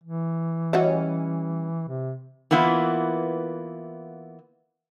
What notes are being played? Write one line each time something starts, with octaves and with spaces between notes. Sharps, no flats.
E3
G3 C#4 F#4 D#5 E5
C3
E3 A#3 B3 E4 F4